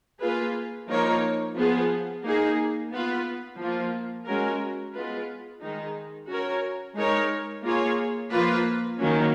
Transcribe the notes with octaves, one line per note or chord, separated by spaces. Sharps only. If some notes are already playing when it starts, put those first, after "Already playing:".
A#3 F4 G#4 B4
F3 A#3 D#4 A#4 C#5
F3 B3 F4 G#4
A#3 D#4 G#4
B3 F4 B4
F3 A#3 F4
G#3 C#4 F#4 A#4
G#3 B3 F4 B4
D#3 G#3 D#4
C#4 F#4 A#4 C#5
G#3 D#4 A#4 C#5
A#3 F4 G#4 C#5
F3 A#3 F4 B4
D#3 F#3 A#3 C#4